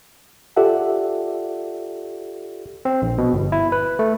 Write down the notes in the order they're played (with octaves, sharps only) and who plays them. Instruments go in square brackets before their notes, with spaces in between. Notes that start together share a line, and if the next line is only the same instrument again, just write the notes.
[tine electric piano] F4 G4 A4 D5 E5 F#5
C4
A#1
B2
G1
E4
B4
A3